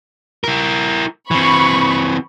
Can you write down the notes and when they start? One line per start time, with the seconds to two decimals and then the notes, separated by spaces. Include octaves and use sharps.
0.44 E4 A#4
1.31 E3 C4 B5 C#6